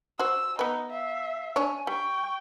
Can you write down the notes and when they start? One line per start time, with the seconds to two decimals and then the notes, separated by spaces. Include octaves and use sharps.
0.19 F#4 C5 E6
0.59 B3 D#4 B4
0.91 E5 F5
1.56 D4 C#5 G#5
1.87 G3 G5 C#6